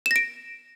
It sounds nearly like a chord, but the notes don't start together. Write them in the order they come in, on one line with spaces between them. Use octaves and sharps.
E7 A#6 D7